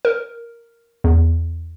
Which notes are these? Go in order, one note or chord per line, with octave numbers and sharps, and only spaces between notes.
A#4
E2